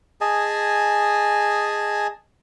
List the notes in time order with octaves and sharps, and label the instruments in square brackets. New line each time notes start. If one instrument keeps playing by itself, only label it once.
[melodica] G#4 D#5 G#5 A5